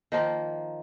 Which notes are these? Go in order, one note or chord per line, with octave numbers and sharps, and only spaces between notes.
D#3 F3 A#3